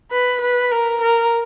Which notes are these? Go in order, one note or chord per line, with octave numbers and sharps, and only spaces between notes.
B4
B4
A#4
A#4